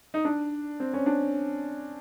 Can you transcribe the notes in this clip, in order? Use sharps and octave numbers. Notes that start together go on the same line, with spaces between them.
D#4
D4
C4
C#4
D4